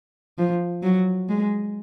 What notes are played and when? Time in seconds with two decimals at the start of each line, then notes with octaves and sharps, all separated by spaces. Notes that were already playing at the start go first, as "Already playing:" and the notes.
0.38 F3
0.83 F#3
1.29 G#3